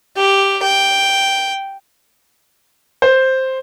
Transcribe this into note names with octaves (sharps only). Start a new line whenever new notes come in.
G4
G5
C5